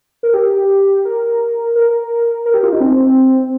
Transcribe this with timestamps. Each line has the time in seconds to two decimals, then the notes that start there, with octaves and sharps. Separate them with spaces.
0.23 A#4
0.34 G4
1.05 A#4
1.75 A#4
2.46 A#4
2.54 G4
2.63 F4
2.72 D#4
2.80 C4